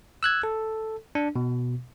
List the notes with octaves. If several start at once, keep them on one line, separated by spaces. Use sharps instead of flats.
E6 F#6 G#6
A4
D4
B2